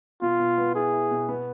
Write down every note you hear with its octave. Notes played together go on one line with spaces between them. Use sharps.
B2 F4
B2
B3
E4 G#4
E4
B2
B3